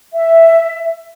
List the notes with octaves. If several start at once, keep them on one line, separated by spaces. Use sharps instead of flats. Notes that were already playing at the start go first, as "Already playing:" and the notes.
E5